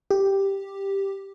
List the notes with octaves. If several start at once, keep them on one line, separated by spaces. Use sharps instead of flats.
G4